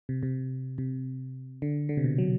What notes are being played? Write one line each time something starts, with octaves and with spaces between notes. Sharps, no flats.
C3
C3
C3
D3
D3
C3
B2
F#3